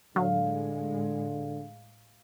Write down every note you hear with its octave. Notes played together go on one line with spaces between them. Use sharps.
A2 D3 F#3 G#3 F5